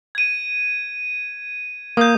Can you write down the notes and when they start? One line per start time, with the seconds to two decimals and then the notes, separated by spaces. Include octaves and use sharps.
0.15 G#6 D#7
1.97 A#3 D#6 G6